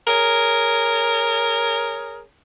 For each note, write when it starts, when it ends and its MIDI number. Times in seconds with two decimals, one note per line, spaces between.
0.07 2.22 68
0.07 2.22 70
0.07 2.22 73